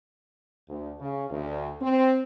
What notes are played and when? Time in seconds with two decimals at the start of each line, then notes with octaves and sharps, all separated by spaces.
0.69 D2
1.00 C#3
1.30 D2
1.80 C4